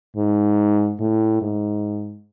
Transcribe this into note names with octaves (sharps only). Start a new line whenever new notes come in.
G#2
A2
G#2